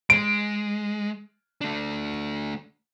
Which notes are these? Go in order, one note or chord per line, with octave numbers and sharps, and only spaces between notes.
G#3 D7
A3 D4